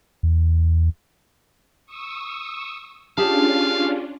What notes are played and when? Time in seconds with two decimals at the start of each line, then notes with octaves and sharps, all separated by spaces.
0.23 E2
1.86 C#6 D#6 E6
3.18 C#4 D4 F4 G4 G#4 F5 A5